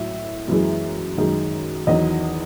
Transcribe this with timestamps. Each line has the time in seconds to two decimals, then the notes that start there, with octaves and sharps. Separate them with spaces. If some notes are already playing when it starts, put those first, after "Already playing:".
Already playing: A2 F#3 E5
0.47 F#2 E3 G#3
1.17 F#2 D#3 G#3
1.87 E2 D#3 F#3 D#5